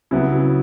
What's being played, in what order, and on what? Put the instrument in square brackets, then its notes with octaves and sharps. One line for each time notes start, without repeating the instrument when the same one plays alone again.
[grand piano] C#3 F#3 B3 E4